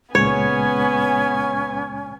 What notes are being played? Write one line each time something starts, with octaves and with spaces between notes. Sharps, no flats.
C#2 A#2 G#3 B3 C#4 C#5 G#5